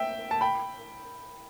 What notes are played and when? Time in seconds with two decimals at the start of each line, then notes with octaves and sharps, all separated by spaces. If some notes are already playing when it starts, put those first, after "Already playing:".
Already playing: E5 G5
0.31 A5
0.41 G5 B5